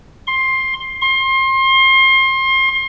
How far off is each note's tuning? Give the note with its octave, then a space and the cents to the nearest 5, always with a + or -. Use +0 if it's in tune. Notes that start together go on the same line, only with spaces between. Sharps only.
C6 +15
C6 +30